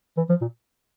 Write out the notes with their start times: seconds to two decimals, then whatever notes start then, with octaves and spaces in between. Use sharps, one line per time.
0.17 E3
0.30 F3
0.41 A#2